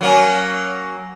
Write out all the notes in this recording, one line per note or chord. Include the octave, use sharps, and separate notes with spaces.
F#3 A#3 C#4